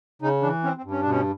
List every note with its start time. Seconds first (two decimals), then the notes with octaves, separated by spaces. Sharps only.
0.22 C#3 D#4
0.42 E3 D4
0.64 C4 C#4
0.77 C4
0.84 G2
0.91 C#4
1.01 B2 D4
1.10 C#4